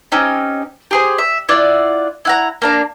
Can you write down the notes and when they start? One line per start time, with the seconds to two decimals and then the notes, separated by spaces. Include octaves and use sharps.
0.12 C4 C#4 D#4 G4
0.91 G4 G#4 C5
1.18 E5
1.49 E4 F4 D5 F#5
2.25 E4 F#5 A#5
2.62 A#3 D4 A#5